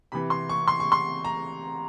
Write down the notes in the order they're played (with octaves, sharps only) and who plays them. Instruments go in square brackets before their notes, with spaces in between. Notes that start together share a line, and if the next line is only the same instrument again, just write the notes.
[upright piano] C3 E3 B5
C6
C#6
C6
C#6
C6
A#5